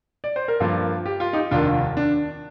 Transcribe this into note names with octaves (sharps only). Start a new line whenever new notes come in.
D5
C5
A#4
G2 F3 A#3 F4 A4
G4
F4
D#4 G4
F1 D#2 D#3 D4 F4
D4